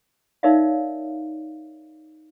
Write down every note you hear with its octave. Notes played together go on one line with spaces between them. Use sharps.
D#4 A#4 C#5 D5 E5 F5